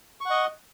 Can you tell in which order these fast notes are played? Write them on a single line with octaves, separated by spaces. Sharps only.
C#6 F#5 D#5